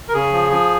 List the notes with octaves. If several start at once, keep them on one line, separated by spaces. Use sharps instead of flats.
A#4
C#3 G#4
F3
F3